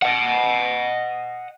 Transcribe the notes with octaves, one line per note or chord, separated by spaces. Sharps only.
D#5 F#5